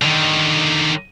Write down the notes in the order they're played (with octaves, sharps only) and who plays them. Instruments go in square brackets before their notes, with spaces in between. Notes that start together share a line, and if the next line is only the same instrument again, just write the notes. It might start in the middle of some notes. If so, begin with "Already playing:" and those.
[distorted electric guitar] D3 D#3